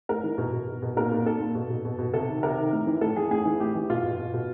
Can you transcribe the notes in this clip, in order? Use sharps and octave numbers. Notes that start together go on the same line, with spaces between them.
A2 A#4
E3
B2
B2
B2
B2
A#2 A#4
A#2
A#2 A4
A#2
B2
B2
B2
B2
C3 A4
D#3
C3 A#4
D#3
A2
E3
A2 A4
E3 G#4
A2 G#4
E3
A2 G4
E3
B2 F4
B2
B2
B2